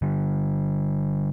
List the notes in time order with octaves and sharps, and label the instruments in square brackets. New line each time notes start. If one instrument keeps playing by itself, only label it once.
[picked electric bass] D3 G3